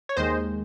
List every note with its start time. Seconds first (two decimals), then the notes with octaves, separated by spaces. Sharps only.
0.09 C#5
0.17 D#2 D#3 G#3 C5 D#5